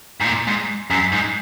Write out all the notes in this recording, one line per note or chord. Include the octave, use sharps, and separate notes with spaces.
G#2
A#2
G#2
F#2
G#2